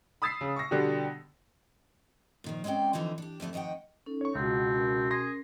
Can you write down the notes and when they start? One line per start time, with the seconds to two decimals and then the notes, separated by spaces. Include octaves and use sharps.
0.22 B5 D#6 E6 A6 B6 C7
0.41 C#3
0.56 C#6 A#6
0.71 B2 D3 G3 D4 F#4 G4
2.44 A#2 D#3 F3
2.64 G#3 C4 C#4 D5 G5
2.93 D3 E3 F3 C4 D#4
3.18 D4 G4
3.40 F2 D3 A3 D4
3.53 F2 D#3 D#5 F#5 G5
4.06 C#4 D#4 A4
4.21 C#5 C#6
4.35 C#2 B2 C4 F4 F#5
4.74 C#4 A#4
5.11 G#4 C6 A#6 C7